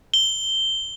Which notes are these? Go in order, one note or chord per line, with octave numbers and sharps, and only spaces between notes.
G7